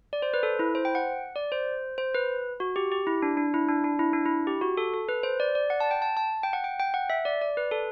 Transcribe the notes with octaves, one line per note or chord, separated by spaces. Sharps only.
D5
C5
B4
A4
E4
C5
G5
F#5
D5
C5
C5
B4
F#4
G4
G4
E4
D4
D4
E4
D4
D4
E4
D4
E4
G4
F#4
A4
A4
B4
C5
D5
D5
F#5
A5
G5
A5
A5
G5
F#5
G5
G5
F#5
E5
D5
D5
B4
A4